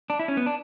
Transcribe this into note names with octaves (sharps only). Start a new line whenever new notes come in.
D4
E4
C#4
B3
D4